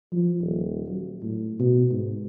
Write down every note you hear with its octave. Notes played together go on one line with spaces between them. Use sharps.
F3
D#1
F#3
A2
B2
G#2